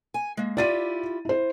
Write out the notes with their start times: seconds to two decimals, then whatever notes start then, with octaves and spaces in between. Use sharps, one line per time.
0.14 G#5
0.37 G#3 A#3
0.57 E4 F4 G4 D5 A6 D#7
1.25 E4 C5